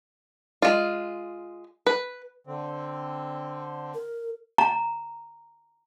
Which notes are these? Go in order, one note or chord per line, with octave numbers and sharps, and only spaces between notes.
G#3 F4
B4
D3 C4
A#4
A#5